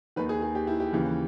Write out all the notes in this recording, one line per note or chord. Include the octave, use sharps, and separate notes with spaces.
D#2 D#3 B4
G#4
G#4
G4
E4
G4
D#2 C#3 E3